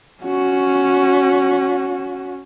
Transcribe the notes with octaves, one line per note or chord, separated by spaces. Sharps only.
C#4 F#4